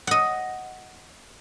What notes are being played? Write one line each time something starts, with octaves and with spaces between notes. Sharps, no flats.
D#5 F#5